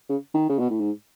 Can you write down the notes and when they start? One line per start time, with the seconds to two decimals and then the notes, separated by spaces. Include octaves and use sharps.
0.09 C#3
0.34 D#3
0.49 C#3
0.59 B2
0.70 A2
0.80 G#2